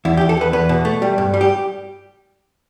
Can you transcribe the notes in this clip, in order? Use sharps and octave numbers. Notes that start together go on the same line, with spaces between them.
E2 E4
G4
E2
A4
E2 B4
E2 B4
B2
A3
G3
G2
G3
G4